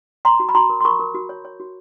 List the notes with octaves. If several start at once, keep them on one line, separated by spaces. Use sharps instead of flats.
C#5 A#5 C6
F#4
B5
F#4 A#5 C6
A#4
C6
A#4 B5 C#6
A#4
F#4
C#5
C#5
F#4